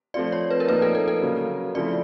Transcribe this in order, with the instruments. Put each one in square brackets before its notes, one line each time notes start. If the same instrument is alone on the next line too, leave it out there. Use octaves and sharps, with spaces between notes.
[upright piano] F3 A3 C4 F4 [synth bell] D5
[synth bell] C#5
B4
A#4
[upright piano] A#2 F3 A#3 D#4 [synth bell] B4
[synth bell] A4
A4
A4
[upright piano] C#3 F#3 A#3
[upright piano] C#3 F3 A3 C4 E4 [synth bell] D5